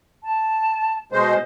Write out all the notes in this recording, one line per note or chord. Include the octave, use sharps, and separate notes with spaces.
A5
B2 G#3 C5 D#5